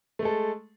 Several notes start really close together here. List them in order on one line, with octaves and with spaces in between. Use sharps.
A3 G#3 A4